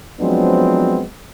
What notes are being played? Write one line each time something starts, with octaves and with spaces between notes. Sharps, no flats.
F3 F#3 G#3 B3 C4 D4